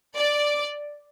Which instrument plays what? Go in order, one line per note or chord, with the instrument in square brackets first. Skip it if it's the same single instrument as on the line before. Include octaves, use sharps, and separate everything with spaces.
[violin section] D5